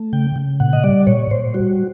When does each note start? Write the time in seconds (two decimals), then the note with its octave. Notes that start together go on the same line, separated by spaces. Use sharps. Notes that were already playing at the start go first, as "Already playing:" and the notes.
Already playing: A3
0.13 C#3 G5
0.36 C#3
0.60 A#2 F#5
0.73 D#5
0.84 G3 D5
1.07 A#2 C#5
1.31 A#2 C5
1.54 G3 F#4